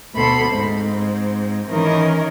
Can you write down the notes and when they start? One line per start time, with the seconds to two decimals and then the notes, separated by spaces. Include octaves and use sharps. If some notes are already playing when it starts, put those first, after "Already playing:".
0.14 D2 B2 A4 B5 C6
0.50 G#2 C4
1.68 D#3 E3 C#4 A#4 D#5